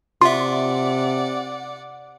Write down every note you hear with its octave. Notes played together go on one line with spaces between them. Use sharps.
C3 F4 D5 E5 F#5 C6